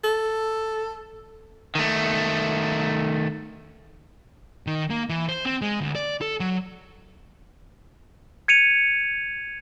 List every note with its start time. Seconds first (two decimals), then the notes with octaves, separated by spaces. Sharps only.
0.04 A4
1.75 D#3 A3
4.67 D#3
4.90 A#3
5.09 E3
5.28 C5
5.45 C4
5.62 G#3
5.81 D2
5.95 D5
6.21 A4
6.40 F#3
8.48 G#6 C#7 D#7 F7